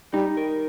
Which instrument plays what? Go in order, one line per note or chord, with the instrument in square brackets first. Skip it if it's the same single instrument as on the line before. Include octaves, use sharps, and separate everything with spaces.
[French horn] G3 [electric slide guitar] D#4
[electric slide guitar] A#4